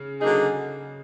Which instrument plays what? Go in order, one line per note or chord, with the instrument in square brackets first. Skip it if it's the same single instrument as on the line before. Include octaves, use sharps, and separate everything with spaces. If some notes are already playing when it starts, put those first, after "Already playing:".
Already playing: [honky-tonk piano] C#3
[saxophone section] D3 F#3 A#3 D#4 G#4